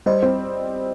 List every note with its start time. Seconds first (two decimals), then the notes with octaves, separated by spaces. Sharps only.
0.06 G3 C5 D#5
0.22 C4